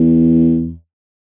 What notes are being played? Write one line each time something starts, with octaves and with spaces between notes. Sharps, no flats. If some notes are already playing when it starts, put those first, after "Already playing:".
Already playing: E2